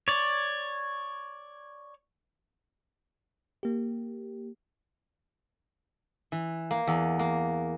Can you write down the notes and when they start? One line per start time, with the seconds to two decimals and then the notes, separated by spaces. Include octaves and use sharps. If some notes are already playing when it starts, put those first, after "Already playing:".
0.08 C#5 D5
3.63 A#3 G4
6.32 E3
6.71 A#3
6.87 E2
7.19 A#3